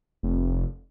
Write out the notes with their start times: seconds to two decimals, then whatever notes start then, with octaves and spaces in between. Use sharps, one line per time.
0.23 F1